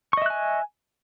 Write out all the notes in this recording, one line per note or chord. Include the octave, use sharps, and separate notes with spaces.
D#5 E5 G#5 C#6 F#6